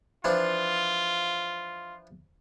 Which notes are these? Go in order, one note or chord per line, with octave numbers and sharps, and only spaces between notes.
E3 F3 D4 F4